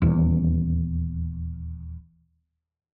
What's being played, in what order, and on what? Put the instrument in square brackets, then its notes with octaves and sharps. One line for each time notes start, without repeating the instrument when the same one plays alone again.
[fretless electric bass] D#1 E2